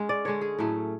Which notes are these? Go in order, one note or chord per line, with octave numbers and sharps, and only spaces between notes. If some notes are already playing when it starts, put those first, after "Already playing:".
Already playing: G#3 C#4
D5
D3 G#3 C#4 C#5
G#4
A2 F#3 A3 C#4